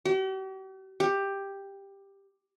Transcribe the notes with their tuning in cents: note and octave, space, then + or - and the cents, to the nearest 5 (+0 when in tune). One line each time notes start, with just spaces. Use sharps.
G4 -45
G4 +10